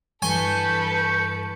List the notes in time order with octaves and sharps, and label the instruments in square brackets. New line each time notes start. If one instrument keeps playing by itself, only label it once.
[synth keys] G2 E3 [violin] A4 B4 [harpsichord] G#5 [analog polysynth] C#6 G6 C#7